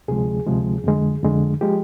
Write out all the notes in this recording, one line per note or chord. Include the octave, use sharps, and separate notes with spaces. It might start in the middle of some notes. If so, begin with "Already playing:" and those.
D2 C3 F3 G#3 G#4
D2 C3 F3 G#3
F2 D3 G#3
F2 D3 G#3
F3 G#3 G4